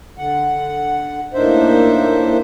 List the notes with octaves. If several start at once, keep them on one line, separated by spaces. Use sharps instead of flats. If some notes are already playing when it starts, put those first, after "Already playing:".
D3 F#5
A2 A#3 D4 D#4 C5 E5